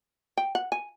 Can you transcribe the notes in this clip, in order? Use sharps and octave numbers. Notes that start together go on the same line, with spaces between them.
G5
F#5
G#5